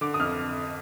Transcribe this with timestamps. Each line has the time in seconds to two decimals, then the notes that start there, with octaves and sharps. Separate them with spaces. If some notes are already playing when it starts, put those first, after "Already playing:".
0.01 D3 D6
0.14 D#6
0.20 F2 F6